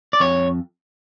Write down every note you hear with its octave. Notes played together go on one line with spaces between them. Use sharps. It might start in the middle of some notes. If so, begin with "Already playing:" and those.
D5
F2 C#5